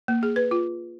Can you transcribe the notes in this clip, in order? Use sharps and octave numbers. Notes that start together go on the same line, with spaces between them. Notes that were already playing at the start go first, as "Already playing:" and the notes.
A#3
G#4
B4
F4